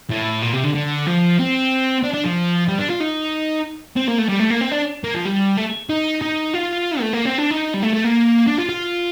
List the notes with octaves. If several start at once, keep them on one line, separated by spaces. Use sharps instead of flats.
A2
A#2
C3
D3
D3
F3
C4
D4
D4
F3
G3
D4
F4
D#4
C4
A#3
A3
G3
A3
A#3
C4
D4
A#3
F3
G3
A3
D#4
D#4
F4
A3
A#3
C4
D4
D#4
G3
A3
A3
A#3
D4
F4
F4